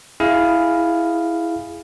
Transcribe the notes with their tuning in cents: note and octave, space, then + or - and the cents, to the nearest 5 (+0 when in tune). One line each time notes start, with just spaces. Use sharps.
E4 +0 G#4 +0 F5 +0